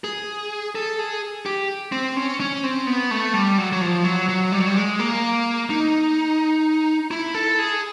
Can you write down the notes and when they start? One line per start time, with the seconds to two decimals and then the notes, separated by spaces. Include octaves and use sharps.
0.04 G#4
0.75 A4
0.99 G#4
1.46 G4
1.92 C4
2.17 C#4
2.40 C#4
2.63 C4
2.87 B3
3.11 A3
3.34 G3
3.58 F#3
3.72 F#3
3.81 F3
4.04 F#3
4.29 F#3
4.52 G3
4.60 F#3
4.68 G3
4.76 G#3
4.99 A#3
5.70 D#4
7.11 E4
7.35 A4
7.59 G#4